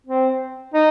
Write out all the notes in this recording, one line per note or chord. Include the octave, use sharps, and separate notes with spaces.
C4
D#4